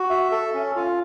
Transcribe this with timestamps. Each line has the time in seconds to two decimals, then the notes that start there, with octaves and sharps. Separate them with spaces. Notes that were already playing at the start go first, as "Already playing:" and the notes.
Already playing: F#4
0.10 E5
0.31 A4
0.54 C#4
0.76 F4